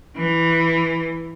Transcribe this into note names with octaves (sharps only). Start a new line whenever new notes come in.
E3